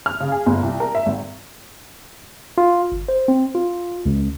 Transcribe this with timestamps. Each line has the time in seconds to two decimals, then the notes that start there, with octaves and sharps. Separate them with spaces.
0.06 F6
0.20 C#3
0.32 G#4
0.46 G1
0.63 C2
0.80 A#4
0.95 E5
1.06 G#1
2.58 F4
2.92 G1
3.08 C5
3.28 C4
3.55 F4
4.06 C#2